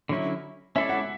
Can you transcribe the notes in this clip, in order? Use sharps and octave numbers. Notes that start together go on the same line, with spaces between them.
D3 F#3 C#4 E4
C#4 E4 A4 D5 E5
F#5